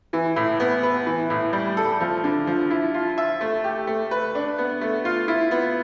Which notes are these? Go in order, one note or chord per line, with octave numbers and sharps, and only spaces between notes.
E3
A2
B3
B4
E3
A2
G3
A4
F3
D3
F3
E4
F4
E5
A3
G4
A3
B4
D4
B3
A3
F4
E4
B3